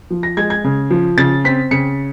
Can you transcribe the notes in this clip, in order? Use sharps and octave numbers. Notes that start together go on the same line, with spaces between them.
F3
A#6
G#3 G#6
G#6
C#3
F3
C#3 A6
C4 B6
C#3 C#7